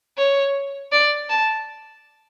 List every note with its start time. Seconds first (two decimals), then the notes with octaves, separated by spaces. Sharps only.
0.18 C#5
0.92 D5
1.30 A5